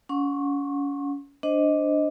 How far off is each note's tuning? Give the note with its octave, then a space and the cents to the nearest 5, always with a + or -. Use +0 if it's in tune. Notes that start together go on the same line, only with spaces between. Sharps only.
C#4 +30 F#5 -30 C#6 -40
D4 +0 C5 +0 D#5 +5